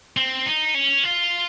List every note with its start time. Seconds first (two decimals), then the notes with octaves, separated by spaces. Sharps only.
0.17 C4
0.46 D#4
0.75 C#4
1.04 F4